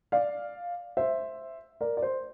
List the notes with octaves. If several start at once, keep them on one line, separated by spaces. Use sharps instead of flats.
D5 F5
C5 E5
A#4 D5
D5
C5